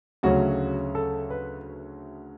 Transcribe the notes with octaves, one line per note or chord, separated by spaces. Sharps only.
D2 C#3 F#3 A3 C#4 F#4
A4
B4